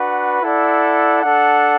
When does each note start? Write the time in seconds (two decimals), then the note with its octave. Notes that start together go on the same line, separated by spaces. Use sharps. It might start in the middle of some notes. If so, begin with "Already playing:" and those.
Already playing: D4 F#4 B4 F#5
0.43 E4 A4 D5 F#5
1.21 D4 A4 F#5